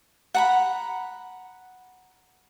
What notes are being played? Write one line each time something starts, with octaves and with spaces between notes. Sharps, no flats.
F#5 A#5 B5